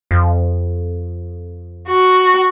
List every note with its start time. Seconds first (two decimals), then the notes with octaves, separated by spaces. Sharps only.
0.11 F2
1.89 F#4